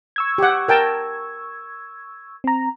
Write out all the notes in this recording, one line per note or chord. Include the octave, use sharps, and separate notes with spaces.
C#6 E6 G#6
G4 F#5
A#4 G5 A5
C4 A#5